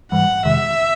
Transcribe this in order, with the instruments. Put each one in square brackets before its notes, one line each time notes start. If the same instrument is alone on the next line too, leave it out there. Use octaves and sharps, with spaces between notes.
[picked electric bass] G#2 E3 G3 [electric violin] F#5
[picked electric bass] F2 C3 D#3 G#3 [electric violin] E5